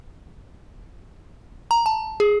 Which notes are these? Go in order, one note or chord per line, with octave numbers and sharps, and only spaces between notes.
A#5
A5
G#4